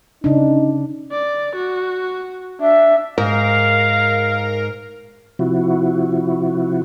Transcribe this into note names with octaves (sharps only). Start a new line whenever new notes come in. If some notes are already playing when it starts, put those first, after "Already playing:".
C#3 D4 D#4
D5
F#4
D4 E5
G#2 A#4 F5
C3 F3 E4 F#4